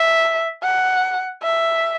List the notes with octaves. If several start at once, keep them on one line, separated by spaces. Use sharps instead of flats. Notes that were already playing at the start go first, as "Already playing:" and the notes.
Already playing: E5
F#5
E5